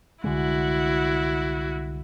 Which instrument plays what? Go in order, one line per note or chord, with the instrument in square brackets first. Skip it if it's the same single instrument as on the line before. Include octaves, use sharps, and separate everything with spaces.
[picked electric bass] C2 D3 G#3 [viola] E4 F#4